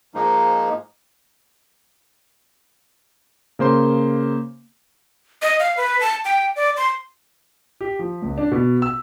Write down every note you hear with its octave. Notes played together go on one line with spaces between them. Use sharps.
G#2 F3 G#3 A#3 D#4
C#3 A#3 C5 C6
D#5
F5
B4
A5
G5
D5
C6
G4
F3
C#2
D4
B2
E6